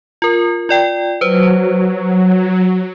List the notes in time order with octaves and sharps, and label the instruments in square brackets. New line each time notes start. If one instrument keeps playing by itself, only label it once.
[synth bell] F4 A#4
F4 D5 G5
[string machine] F#3 [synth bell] B4 C5